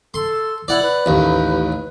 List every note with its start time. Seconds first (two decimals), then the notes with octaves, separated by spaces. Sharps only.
0.14 A4 C6
0.68 E4 D5 F#5
0.82 B4
1.06 A1 D#2